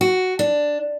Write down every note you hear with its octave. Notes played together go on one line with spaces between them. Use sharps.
F#4
D4